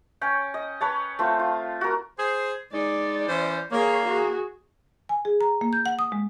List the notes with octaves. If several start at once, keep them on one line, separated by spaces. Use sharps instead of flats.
C#4 C#5 G5
D#5
B4 C#5 A5
A3 C4 F4
F4
F#4 A#4
G#4 C5
G#3 D#4 D5
E3 C#4 C5
A#3 G#4 C#5
F#4 G#4
G#5
G#4
A#5
A#3
G6
F#5
D#6
G#3